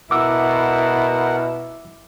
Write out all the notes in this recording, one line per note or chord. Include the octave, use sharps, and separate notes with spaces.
B2 E4 A#4 F#5 D6 E6